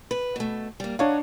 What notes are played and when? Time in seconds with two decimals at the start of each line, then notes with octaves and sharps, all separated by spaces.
0.11 B4
0.36 B2 A3
0.80 G3 A#3
0.99 D4 D#4 C#5 F5 F#5